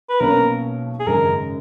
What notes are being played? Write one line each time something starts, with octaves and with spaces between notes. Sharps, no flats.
B4
B1 B2 A#3 C#4 A#4
G#4
G#1 F#2 C#3 G#3 A#4